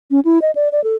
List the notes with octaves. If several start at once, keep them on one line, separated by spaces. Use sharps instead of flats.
C#4
E4
D#5
D5
D5
A4